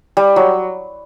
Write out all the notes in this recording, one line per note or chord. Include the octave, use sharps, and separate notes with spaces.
G3
F#3